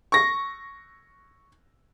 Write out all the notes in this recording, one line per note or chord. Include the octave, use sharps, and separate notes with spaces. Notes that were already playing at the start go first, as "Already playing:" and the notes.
C#6 A#6